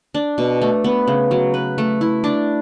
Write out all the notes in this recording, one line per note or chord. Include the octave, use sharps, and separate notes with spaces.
D4
B2
A3
B3
C#3
F#3
B4
A3
E4
D4